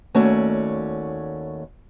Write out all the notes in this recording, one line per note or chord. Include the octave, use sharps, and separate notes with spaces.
D#2 A3 C#4 F#4 C#5 D5